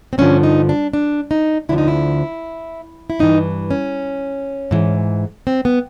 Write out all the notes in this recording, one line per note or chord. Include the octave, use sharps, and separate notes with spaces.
C4
G2 D3 F3 C#4
D#4
D4
D4
D#4
D2 D3 F3 E4
D#4
E4
E4
G2 E3 D#4
C#4
G#2 E3
C4
B3